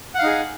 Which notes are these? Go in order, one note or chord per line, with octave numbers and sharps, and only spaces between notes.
D#4 G#4 F5 F#5